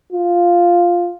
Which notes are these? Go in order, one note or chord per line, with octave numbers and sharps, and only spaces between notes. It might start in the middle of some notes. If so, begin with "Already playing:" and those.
F4